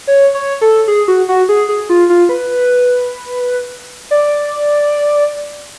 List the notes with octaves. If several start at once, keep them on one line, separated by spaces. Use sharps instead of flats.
C#5
C#5
A4
G#4
F#4
F#4
G#4
G#4
F4
F4
B4
D5